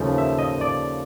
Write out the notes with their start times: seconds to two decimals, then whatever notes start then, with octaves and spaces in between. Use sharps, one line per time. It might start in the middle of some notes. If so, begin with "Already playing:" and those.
Already playing: D#2 C#3 F3 A3
0.18 E5
0.39 D#5
0.61 D5